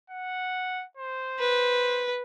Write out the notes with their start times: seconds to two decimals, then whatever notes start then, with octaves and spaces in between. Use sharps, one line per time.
0.10 F#5
0.97 C5
1.39 B4